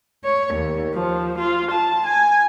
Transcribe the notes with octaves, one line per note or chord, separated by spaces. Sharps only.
C#5
D#2
F3
F4
A5
G#5